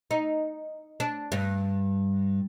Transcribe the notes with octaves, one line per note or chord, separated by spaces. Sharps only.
D#4
D4
G2